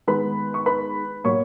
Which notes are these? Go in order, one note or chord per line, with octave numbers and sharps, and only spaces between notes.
D#3 G#3 B3 B4 B5
C#6
B4 B5
B2 F#3 A#3 C#5 C#6